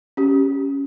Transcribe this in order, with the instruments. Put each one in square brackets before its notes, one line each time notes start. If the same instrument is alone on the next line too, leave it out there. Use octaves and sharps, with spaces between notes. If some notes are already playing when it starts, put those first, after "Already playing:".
[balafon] C#4 G4